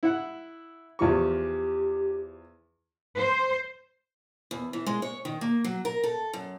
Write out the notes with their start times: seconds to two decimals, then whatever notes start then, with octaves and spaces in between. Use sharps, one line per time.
0.03 E4 F#5
0.99 E2 F3 G4 C#6
3.18 C5
4.51 E2
4.73 E3
4.86 G#3
5.02 C#5
5.25 D#3
5.41 A#3
5.64 F#3
5.85 A#4
6.04 A4
6.33 F#2